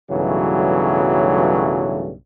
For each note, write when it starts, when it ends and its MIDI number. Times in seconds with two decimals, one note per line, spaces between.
0.11 2.12 35
0.11 2.12 43
0.11 2.12 49
0.11 2.12 52
0.11 2.12 54
0.11 2.12 57